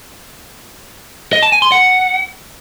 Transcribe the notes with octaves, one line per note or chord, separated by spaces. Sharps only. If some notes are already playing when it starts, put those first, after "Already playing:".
D#5
A5
G#5
C6
F#5